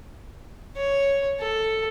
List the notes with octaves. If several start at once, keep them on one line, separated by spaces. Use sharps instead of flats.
C#5
A4